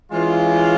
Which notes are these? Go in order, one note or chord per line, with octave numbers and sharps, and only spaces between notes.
E3 G#3 C#4 F4